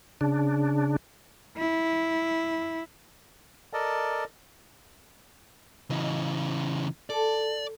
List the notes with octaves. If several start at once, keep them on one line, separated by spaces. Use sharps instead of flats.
C#3 D4
E4
A4 A#4 D5 D#5 A5
C#3 E3 F#3 C#4 D#5
A4 D5